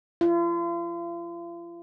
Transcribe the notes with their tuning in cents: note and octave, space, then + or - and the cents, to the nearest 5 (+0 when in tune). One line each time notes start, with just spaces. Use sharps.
F4 -40